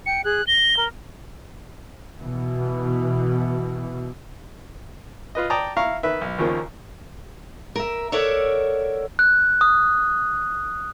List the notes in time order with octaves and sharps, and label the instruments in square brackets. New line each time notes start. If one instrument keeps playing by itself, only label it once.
[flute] G5 [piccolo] C#7
[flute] G#4 [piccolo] F#6
[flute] A#6 [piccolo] G7
[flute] A#4
[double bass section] B2 E3
[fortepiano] F4 B4 D#5
D5 G5 A5 A#5 D#6
E4 F5 A#5 C#6
D#3 B4 E5
B1
D#2 C#3 F3 A#3
[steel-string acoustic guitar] A#4 E5
A4 A#4 C#5 D5 E5 F#5
[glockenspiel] F#6
D#6